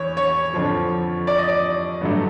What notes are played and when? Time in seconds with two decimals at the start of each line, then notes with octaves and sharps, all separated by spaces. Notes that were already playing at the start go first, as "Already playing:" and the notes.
Already playing: E2 C#5
0.17 C#5
0.54 F2 D3 F3
1.27 D5
1.38 D#5
1.49 D5
2.01 G2 D3 F#3 A3